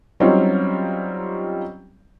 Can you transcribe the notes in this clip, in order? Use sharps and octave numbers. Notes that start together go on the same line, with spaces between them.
F#3 G3 C4 C#4 D#4 F4